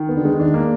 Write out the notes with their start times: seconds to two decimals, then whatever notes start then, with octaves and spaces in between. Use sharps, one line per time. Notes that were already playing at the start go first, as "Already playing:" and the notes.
Already playing: D#3
0.09 B3
0.16 D3
0.25 G#3
0.39 D#3 D4
0.54 A#3